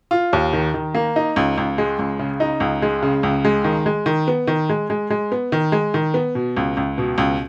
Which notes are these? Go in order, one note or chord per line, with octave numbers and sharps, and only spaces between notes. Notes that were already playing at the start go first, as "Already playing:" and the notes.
F4
D#2
D#3
D#3
A#3
D#4
C#2
C#2
G#3
C#2
C#3
D#4
C#2
G#3
C#3
C#2
G#3
D#3
G#3
D#3
B3
D#3
G#3
G#3
G#3
B3
D#3
G#3
D#3
B3
B2
C#2
C#2
B2
C#2